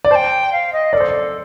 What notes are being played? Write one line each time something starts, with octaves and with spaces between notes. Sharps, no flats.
D5
C5 G5 A5
F5
D#5
A#4 D5
A4 C5
D5